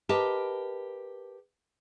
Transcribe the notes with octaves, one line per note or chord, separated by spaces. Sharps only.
G4 A#4 B4 D#5 A5